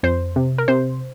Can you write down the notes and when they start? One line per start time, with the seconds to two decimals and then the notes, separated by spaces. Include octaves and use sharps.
0.03 F2 C5
0.36 C3
0.58 A#4
0.68 C3 C5